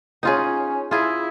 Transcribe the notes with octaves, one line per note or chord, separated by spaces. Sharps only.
C#4 D#4 F4 G#4
E4 F4 G#4